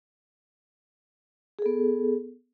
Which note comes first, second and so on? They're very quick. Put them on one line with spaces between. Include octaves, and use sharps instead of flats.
G#4 A4 B3